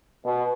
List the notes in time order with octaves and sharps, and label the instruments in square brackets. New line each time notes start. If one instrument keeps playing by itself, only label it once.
[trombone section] B2